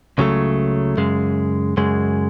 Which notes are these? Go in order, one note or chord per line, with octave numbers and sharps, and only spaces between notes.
C#2 C#3 F#3 A3
F#2 C#3 G#3
F#2 C#3 G#3